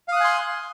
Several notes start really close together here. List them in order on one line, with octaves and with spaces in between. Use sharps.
F5 D#6 F#6 G#5 C6